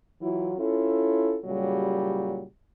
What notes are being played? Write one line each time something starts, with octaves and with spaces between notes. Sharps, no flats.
E3 F#3 E4 F4
C#4 E4 F4 A4
A#2 C#3 F#3 G3